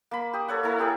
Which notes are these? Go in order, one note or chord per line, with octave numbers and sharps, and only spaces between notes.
A#3 B5
G4 D#6
A4 C#5 F#5
A#3 E4 A4
E4 G4 G#4 A#4